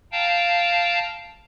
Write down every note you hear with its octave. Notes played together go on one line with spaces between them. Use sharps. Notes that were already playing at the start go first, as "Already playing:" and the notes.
F5 G5 A5 A#5